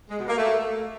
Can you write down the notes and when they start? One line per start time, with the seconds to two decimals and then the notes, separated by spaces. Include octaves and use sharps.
0.09 G#3
0.19 B2
0.28 A#3
0.37 A3